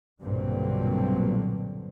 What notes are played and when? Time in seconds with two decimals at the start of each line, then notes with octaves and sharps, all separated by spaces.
0.21 B1 G2 A#2 D3 F#3 C4